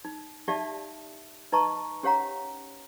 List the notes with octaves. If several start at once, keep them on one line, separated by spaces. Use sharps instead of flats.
D#4
D#4 G4 D5 E5 F5 A5
D#4 B4 D#5 A5 A#5 C#6
C#4 G4 C#5 F5 F#5 A#5